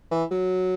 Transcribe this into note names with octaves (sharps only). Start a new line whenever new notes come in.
E3
F#3